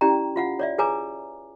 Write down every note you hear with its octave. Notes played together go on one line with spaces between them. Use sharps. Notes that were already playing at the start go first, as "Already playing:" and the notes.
C#4 E4 G4 D5 G5 A#5
F4 F5 F#5
C#5 D5 E5
G#4 B4 C#5 G#5 A#5 D6